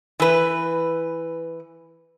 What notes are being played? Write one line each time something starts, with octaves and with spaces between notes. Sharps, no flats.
E3 B4